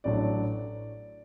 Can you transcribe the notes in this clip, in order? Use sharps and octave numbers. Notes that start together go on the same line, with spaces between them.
A1 A2 F#3 A3 D4 D5